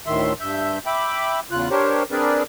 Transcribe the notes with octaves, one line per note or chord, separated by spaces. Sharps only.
D2 A2 D#3 E5 C6
G2 E5 G6
E5 G5 B5 D6
E2 C#3 F4 F#6
D4 G4 A#4 C5 C#5
C4 D4 G#4 A#4 B4 D5